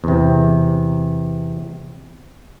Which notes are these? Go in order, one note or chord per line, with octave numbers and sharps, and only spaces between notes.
E2 C3